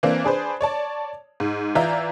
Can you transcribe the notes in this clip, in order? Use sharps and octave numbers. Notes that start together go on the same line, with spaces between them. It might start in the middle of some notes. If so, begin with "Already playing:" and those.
E3 A#3 C4 D4
D4 G#4 B4 C5
C#5 D5 A5
G#2
E3 F4 D5 E5 A#5 G6